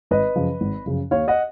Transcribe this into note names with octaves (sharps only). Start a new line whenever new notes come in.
G#1 B4 D#5
F#2 C#3 F3
G#1
F#2 C#3 F3
D#2 C#5 F5
D#5 F#5